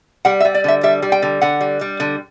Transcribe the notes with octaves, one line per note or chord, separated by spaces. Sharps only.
G3 F#5
E5
G3
D5
D3 E5
G3 E5
G3
G5
D3
D3 F#5
G3
G3
D3